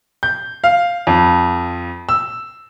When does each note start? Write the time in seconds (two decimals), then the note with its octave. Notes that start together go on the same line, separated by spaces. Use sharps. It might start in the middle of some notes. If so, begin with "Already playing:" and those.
0.23 G6
0.64 F5
1.07 F2
2.09 E6